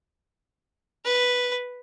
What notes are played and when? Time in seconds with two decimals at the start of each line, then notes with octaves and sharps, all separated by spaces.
1.05 B4